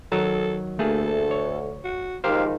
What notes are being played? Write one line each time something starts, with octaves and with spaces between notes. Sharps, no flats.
D#3 F#3 A4 A#5
D2 A3 A#3 G#4 A4
C#5
F#4
G#2 D#3 F3 G4 A#4 C5 F5